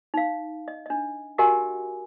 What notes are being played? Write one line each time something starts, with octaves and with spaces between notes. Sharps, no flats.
D#4 F5
D#5
D4 D#5
F#4 G4 A#4 D#5 F#5 G#5